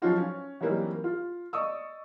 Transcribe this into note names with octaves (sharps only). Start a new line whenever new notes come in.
F3 F#3 C#4 D#4 F4 F#4
C#4
E3 F#3 G3 A#3 C4 D#4
F4
D5 D#5 C#6 D#6 E6